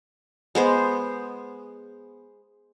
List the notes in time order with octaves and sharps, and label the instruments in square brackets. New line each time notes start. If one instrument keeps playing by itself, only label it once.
[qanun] G#3 B3 C5